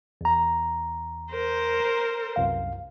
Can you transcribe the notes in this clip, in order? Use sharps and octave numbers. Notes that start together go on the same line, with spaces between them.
E2 A#5
A#4 C5
C2 F#2 F5